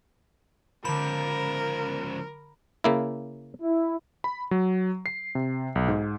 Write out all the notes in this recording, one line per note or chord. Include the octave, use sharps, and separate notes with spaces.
C#2 D3 F3 A#4 B5
C#3 A#3 E4
E4
B5
F#3
C7
C3
B1
G#2